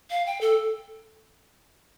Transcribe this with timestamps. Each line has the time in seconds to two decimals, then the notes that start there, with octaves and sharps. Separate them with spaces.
0.10 F5
0.26 G5
0.41 A4